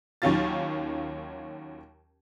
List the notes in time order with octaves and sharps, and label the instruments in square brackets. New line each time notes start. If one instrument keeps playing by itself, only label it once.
[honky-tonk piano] D#2 D#3 F#3 C#4 F4 A6